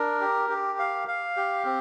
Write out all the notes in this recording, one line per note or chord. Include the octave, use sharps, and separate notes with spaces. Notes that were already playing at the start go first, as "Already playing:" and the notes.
Already playing: D4 A#4
G4
G4
F5
F5
G4
C4